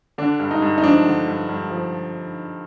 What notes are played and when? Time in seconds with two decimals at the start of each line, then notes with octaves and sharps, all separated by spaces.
0.18 D3 D4
0.40 G2
0.51 D#4
0.62 G2
0.78 D#4
0.83 F3 D4
1.06 D3
1.28 G2
1.49 G2
1.71 F3